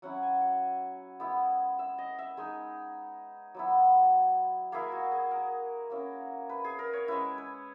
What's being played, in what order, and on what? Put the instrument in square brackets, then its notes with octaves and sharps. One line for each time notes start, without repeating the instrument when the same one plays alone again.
[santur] F#3 C#4 E4 F#5
G#5
F#5
G#3 B3 E4
E5
D#5
E5
G#3 D#4 G#4
F#3 B3 E4
A#3 E4 G#4
F#4
G#4
A#4
A#3 C#4 E4
B4
G#4
A#4
C#5
G#3 C#4 E4 B4
B4